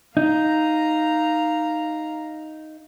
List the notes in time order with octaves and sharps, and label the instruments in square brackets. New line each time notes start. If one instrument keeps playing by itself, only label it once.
[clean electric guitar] D#4 [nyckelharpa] F5 A#5